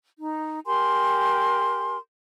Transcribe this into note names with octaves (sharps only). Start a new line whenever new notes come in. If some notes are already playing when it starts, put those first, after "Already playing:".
D#4
G4 A#4 G#5 C6